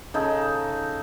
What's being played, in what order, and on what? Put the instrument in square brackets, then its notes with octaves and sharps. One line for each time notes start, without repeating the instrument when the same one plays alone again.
[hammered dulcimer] C#3 D#4 A4